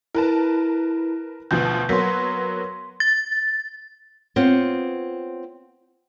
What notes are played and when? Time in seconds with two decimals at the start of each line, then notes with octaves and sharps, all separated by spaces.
0.15 E4 A#4 B4 A5
1.51 D2 B2 F3 G6
1.89 F#3 A#3 B3 C6 B6
3.00 A6
4.36 B3 C4 F4 C#5